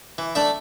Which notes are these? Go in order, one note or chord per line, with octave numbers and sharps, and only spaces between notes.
E3
A3 D4 A4 E5